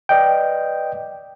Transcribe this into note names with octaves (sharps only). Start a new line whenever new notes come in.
B4 D5 D#5 G5